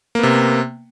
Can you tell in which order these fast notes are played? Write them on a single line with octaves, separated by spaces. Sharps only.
A#3 B3 C3